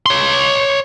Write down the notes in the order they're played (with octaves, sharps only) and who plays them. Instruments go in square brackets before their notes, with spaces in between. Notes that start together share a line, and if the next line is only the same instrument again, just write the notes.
[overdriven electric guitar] C#5 C6